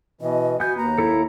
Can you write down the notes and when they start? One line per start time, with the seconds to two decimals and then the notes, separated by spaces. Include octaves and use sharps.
0.21 B2 E3 D#5
0.60 B3 F#4 G#5 G6
0.78 D#2 A#3 A#5
0.98 E4 A4